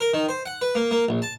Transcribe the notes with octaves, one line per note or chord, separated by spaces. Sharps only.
A#4
D#3
C5
F#5
B4
A#3
A#3
A#1
A5